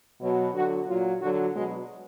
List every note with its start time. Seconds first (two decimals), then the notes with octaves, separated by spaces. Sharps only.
0.20 B2 F#3
0.54 D3 F#3 F#4
0.87 A#2 F#3 F4
1.21 D3 F#3 F#4
1.54 B2 F#3 G#3